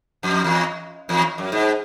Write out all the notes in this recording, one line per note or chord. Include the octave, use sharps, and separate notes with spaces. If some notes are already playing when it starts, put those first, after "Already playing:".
F2
E2
E2
F#2
G#2